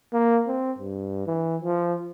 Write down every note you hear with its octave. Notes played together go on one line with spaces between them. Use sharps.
A#3
C4
G2
E3
F3